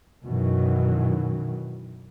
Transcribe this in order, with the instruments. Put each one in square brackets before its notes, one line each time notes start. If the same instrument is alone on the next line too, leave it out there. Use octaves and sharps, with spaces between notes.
[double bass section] F#2 B2 D#3 E3 F#3